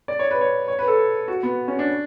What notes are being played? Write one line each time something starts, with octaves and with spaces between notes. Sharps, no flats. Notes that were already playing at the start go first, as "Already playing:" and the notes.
D5
C#5
B4
C#5
C#5
B4
A4
F#4
B3
C#4
D4